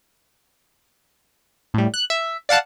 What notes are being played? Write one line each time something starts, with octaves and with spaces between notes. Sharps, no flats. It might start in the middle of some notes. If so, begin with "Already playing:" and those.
A2 G3
F#6
E5
D5 F5 F#5 A5 F#6